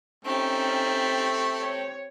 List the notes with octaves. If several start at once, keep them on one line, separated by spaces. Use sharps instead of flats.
A3 C4 C#4 D#4 G4
C#5